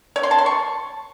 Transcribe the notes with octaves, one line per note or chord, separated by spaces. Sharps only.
C#5
C6
A5
C6
C#6